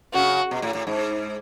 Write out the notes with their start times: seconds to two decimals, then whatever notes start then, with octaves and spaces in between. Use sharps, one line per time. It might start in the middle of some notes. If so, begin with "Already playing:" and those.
0.14 C#3 F#4
0.51 B2
0.62 A2
0.75 A2
0.87 G#2